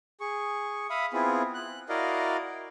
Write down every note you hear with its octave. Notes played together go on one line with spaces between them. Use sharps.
G#4 C#6
E5 F5 B5 D#6
B3 C4 E4 F4 G#4
F#6
E4 F#4 A#4 D5 D#5 F5